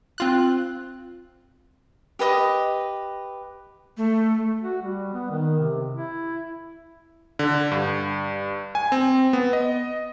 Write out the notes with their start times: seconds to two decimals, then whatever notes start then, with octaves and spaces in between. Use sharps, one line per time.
0.18 C4 F4 F#6
2.19 G4 B4 D#5 D#6
3.97 A3
4.62 F#4
4.82 G3
5.13 B3
5.31 D#3
5.59 C3
5.94 E4
7.39 D3
7.71 G2
8.75 G#5
8.92 C4
9.33 B3
9.53 D#5